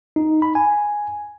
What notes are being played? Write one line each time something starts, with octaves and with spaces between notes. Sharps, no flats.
D#4
B5
G#5